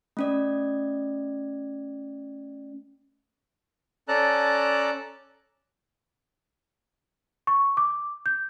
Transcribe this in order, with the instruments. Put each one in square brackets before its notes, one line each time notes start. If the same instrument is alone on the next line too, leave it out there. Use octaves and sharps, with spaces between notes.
[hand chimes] A3 C#4 D5
[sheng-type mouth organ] C#4 A4 D5 A5 A#5 F#6
[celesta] C#6
D6
G6